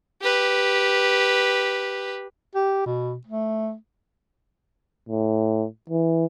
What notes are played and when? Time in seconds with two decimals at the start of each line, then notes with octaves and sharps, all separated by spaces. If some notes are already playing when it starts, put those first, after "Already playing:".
0.22 G4 B4
2.55 G4
2.86 B2
3.27 A3
5.09 A2
5.89 E3